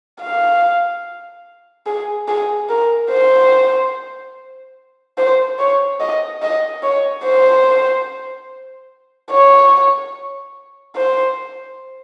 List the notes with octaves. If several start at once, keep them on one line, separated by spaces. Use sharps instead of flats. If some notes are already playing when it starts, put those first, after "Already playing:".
F5
G#4
G#4
A#4
C5
C5
C#5
D#5
D#5
C#5
C5
C#5
C5